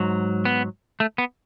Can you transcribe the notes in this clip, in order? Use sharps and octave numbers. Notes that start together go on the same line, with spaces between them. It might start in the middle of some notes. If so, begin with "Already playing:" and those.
Already playing: G#2 F#3
B3
A3
B3